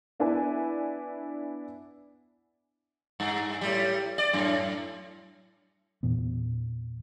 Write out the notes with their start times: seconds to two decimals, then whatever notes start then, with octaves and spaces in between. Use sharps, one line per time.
0.20 B3 D4 E4 B4 G#5
3.20 G2
3.61 A2 G3
4.18 D5
4.33 F#2 A2
6.03 E2 A#2 E3 B3